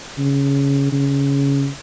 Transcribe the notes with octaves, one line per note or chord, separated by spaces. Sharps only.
C#3
C#3